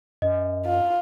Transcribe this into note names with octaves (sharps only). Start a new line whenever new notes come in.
F#2 D#5
F4